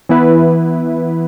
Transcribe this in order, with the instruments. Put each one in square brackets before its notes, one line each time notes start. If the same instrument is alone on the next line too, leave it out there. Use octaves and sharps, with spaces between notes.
[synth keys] E3 B3 E4 B4